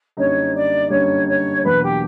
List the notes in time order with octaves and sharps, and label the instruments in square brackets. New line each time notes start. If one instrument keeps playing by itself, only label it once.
[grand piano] F#2 D3 G3 A#3 D#4 [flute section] C#5
[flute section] D5
[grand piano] F#2 D3 G3 A#3 D#4 [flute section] C#5
[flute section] C#5
[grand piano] E2 B2 F#3 A#3 D4 [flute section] B4
[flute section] G4